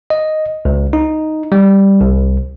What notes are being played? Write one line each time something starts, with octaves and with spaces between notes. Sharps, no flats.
D#5
C#2
D#4
G3
C2